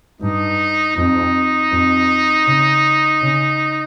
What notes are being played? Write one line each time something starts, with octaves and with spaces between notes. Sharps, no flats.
G2 D#4
F2 D#4
F2
C#3
C#3